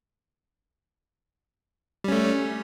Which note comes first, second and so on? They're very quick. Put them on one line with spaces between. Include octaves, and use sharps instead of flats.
G3 C#4 A3